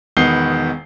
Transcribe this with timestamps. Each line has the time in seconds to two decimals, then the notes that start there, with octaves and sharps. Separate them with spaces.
0.17 E1 D#3 B3 C7 G7